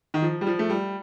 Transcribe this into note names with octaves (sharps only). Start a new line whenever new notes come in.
D#3
F3
G3
F3
A3
G3